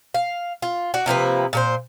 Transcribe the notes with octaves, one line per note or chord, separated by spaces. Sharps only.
F5
F4
F#4 D5
C3 F3 A#3 B4
A#2 A4 C5